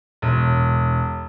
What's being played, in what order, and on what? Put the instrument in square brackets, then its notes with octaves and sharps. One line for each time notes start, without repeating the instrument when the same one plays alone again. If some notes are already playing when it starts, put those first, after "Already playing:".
[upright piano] E1